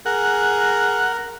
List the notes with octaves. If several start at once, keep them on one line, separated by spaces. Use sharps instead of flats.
G#4 A#4 F#5